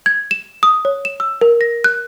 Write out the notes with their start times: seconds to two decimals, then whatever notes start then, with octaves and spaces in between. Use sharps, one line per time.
0.06 G#6
0.31 E7
0.63 D#6
0.85 C#5
1.05 E7
1.20 E6
1.41 A#4
1.61 A#6
1.84 F#6